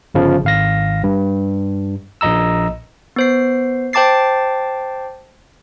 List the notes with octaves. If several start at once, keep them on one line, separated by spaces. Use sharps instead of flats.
G1 C#3 F3
G#1 F5 A#6
G2
A#1 A#2 D#5 A#5 E6
B3 C5 C7
C5 G5 A5 D6 A6 C7